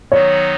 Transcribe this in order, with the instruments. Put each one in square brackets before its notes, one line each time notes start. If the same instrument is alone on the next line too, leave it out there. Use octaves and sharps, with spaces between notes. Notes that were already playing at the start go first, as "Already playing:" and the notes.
[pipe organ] D#3 F#3 B3 D#4 [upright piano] C#5